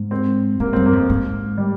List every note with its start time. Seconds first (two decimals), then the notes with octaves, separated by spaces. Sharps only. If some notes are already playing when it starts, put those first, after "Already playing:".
Already playing: G#2
0.11 C4
0.60 G#2 A#3
0.73 G2 C4
0.86 A#3
0.93 F2
1.09 G#2
1.58 G3